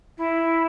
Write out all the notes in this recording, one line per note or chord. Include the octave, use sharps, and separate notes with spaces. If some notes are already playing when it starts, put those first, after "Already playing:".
E4